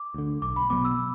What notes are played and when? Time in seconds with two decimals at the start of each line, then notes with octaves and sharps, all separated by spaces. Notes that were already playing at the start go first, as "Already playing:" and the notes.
Already playing: D6
0.14 D2 D3
0.42 B1 D6
0.56 B5
0.70 B2 F#3 B3 D6
0.85 E6